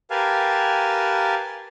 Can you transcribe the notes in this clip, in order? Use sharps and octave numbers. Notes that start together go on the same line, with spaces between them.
G4 A#4 B4 F5 G#5 A5